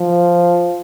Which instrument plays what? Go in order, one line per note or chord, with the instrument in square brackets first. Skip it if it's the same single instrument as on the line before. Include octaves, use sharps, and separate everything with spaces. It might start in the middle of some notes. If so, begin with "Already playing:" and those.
Already playing: [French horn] F3